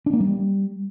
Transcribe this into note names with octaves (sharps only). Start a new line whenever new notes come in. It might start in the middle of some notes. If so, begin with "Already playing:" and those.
D4
A#3
G3